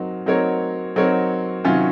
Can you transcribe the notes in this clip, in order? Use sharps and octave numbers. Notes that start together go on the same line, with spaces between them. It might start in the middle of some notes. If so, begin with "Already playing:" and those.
Already playing: F#3 C4 D#4 A#4
F#3 C4 D#4 A#4 C#5
F#3 C4 D#4 A#4 C#5
C3 D#3 F#3 C#4 F4